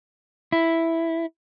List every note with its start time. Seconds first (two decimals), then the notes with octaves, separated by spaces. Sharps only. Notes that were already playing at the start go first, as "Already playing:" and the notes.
0.52 E4